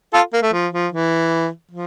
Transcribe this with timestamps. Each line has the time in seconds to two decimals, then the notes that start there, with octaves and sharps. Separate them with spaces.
0.14 F4 A4
0.33 A#3
0.43 A3
0.53 F3
0.73 F3
0.92 E3
1.71 F3